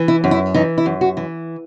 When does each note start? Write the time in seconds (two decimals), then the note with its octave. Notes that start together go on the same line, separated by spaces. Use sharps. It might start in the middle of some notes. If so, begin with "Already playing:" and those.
Already playing: E3
0.08 E4
0.24 F#2
0.31 E4
0.54 E3 D#4
0.78 E4
0.86 F#2
1.01 F#4
1.17 E3